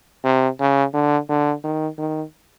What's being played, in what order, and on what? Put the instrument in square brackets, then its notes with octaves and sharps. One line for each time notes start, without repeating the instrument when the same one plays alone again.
[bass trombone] C3
C#3
D3
D3
D#3
D#3